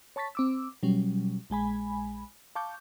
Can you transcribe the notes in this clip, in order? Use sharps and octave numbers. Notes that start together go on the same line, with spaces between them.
C#5 A5 C#6 A6 B6
C4 D6 E6
B2 F#3 G3 C#4
A#1 G#3 G#5 B5
F5 A5 C#6 D6 G6